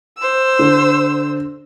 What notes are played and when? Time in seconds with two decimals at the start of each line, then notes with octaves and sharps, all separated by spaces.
0.18 C5 E6
0.59 D3